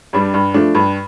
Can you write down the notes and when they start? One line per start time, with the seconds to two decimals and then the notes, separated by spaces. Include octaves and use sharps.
0.13 G2 G3 D4
0.34 G2
0.54 F3 A3 D4
0.75 G2